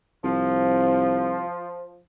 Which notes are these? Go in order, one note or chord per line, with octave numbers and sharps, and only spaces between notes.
C2 F3